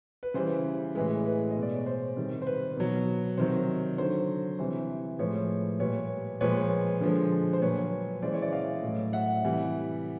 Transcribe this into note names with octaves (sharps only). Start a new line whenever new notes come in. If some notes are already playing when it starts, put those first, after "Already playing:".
B4
C#3 E3 G3 C5
A2 E3 G#3 B4
B4
D#5
B2 G#3
D5
C#5
C5
C3 D#3 G3
C5
B4
B2 F#3
C3 D#3 F#3 C5
D3 F#3 C5
C3 E3 G3 C5
A2 F3 G#3 B4 C#5
A#2 G3 B4 C#5
A#2 F3 G#3 B4 C#5
D3 F3 G#3
C5
A#2 F#3 B4 C#5
C#3 E3 G#3 C5 D5
C#5 D#5
D5 E5
D#5 F5
A2 F#3
E5 F#5
C3 E3 G3